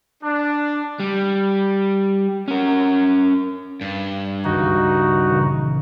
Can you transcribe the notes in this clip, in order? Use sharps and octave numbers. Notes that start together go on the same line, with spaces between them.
D4
G3
C#4 A#4
G2 A6
C#2 F#2 D#3 D#4 F#4
A#2 C#3 E3